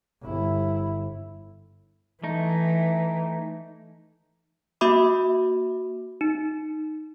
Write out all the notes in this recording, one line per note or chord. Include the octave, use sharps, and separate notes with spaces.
G1 E4
E3 A3 D#4
A#3 F#4 E5 B5 D6
D#4